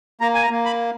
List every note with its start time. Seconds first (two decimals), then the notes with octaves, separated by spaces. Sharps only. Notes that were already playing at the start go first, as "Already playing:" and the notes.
0.21 A#3 A#5
0.34 G#5
0.43 A#5
0.50 A#3
0.65 B5